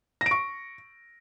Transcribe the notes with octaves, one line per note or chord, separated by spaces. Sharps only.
A#6
D7
C#6